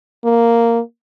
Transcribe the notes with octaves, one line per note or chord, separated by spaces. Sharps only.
A#3